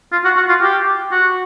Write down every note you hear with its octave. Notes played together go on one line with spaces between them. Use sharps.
F4
F#4
F#4
F4
G4
F#4